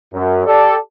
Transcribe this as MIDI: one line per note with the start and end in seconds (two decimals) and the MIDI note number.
0.13 0.45 42
0.46 0.76 67
0.46 0.76 69
0.46 0.76 74